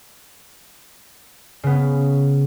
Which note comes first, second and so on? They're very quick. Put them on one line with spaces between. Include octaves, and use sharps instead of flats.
C#3 B3 C#4